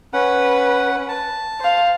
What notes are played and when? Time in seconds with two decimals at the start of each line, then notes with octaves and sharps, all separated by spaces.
0.13 C#4 B4 F#5
1.09 A5
1.60 C5 F5